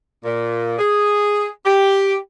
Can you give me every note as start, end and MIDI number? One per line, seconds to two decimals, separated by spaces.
0.24 0.73 46
0.79 1.47 68
1.65 2.16 67